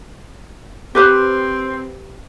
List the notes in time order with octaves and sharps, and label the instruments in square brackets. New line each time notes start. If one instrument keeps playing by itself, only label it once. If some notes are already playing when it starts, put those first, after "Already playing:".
[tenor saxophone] C4 [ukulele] G4 B4 C5